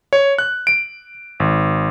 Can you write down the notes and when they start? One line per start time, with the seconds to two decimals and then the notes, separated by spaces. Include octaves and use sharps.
0.13 C#5
0.38 F#6
0.67 D7
1.40 G#1